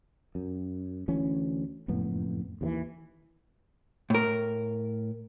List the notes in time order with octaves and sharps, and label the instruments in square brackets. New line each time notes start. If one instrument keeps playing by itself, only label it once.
[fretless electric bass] F#2
D2 E3 C#4
F#1 F2 A2 B3
D#2 C3 E3
[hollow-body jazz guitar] A2 A#4